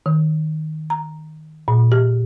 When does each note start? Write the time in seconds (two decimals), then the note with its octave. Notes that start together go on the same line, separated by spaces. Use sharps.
0.06 D#3
0.90 A#5
1.68 A#2
1.92 G4